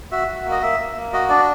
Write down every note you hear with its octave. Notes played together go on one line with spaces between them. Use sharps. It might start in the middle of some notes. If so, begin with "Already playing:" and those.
F#4 E5
F#4
A#3
D#5
A#3 E5
A#3
A#3
F#4 D#5
D4 D5